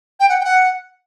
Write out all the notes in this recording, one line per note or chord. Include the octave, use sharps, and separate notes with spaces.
G5
F#5
G5
F#5